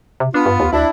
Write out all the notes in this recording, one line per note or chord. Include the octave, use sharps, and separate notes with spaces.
C3
B3 D4 F4
G2
D#2
D2 D4 E4